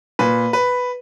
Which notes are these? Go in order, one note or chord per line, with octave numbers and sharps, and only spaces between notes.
A#2 B4
B4